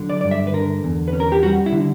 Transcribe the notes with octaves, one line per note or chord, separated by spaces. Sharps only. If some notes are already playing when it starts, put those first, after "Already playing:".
Already playing: D3 F#3
D5
G2 D5
E5
B4
D3 A#4
E2
B4
C#4
A#4
G4
G3 F#4
E4
D3